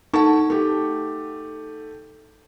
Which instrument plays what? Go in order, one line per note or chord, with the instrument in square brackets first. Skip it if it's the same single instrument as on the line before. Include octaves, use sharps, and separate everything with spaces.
[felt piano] A3 A5 C#6 [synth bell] D#4 F#5
[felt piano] A3 G4